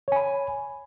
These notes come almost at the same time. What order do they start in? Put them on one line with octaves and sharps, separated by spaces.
C#5 G#5 B5